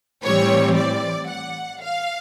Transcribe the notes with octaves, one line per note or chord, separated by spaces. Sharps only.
A2 E3 G3 C4 C#5
D5
F#5
F5